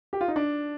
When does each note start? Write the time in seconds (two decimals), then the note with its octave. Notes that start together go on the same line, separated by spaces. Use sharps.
0.13 G4
0.21 F4
0.28 D#4
0.36 D4